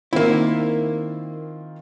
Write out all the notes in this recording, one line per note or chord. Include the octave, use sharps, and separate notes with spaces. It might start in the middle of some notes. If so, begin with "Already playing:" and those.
D#3 A#3 C4 E4 F4